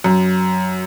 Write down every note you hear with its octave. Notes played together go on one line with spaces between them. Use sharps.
F#2